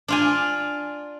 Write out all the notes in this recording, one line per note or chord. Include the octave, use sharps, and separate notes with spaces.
D4 F4 G#5